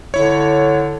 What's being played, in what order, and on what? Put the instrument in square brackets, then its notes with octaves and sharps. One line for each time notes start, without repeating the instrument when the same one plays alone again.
[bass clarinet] D3 [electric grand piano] E4 C#5